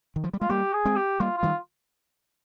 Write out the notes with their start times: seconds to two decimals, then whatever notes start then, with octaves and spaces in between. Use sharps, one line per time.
0.16 D#3
0.24 F3
0.33 G3
0.41 G#3 F4
0.49 G3 A#3 G4
0.73 G#4
0.85 G#3 C4
0.96 G4
1.20 G3 A#3 F4
1.37 F4
1.43 D#3 G3